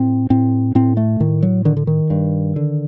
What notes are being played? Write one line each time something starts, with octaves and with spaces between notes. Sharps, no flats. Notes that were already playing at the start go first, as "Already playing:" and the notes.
Already playing: A2 C4
A2 C4
A2 C4
A3
A2 D#3
F#3
D3 D#3
D3
D#3
G2
D3